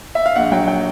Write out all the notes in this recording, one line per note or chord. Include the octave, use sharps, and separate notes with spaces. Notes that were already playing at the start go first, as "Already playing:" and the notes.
E5
F5
A#1 F#5
F#3 G5
G5